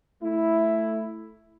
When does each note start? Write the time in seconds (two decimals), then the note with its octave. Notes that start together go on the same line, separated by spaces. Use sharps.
0.23 A3 E4